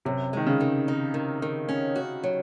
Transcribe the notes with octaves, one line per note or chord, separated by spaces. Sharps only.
F#2 C3
D#3 G#3
C#3
D#3
D#4
D#3
D#3
C#4
F#4
F#3